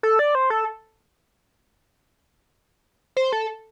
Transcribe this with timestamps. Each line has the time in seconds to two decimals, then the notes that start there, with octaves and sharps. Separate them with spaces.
0.03 A4
0.19 D5
0.35 C5
0.50 A4
3.17 C5
3.32 A4